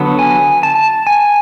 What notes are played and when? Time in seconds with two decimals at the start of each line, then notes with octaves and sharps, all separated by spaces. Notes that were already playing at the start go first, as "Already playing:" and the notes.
Already playing: D3 F#3 B3
0.19 G#5
0.63 A5
1.07 G#5